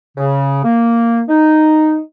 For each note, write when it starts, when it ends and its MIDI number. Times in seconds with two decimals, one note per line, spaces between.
0.18 0.64 49
0.65 1.21 58
1.29 1.99 63